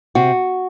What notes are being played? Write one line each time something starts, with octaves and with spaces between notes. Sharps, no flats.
C3 F#4